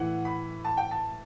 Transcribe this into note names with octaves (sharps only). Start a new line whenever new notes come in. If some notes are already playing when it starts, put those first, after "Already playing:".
Already playing: A2 E3 F#5
B5
A5
G5
A5